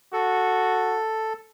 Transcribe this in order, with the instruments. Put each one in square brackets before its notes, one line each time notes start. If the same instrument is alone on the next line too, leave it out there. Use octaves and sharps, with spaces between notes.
[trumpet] F#4 [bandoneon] A4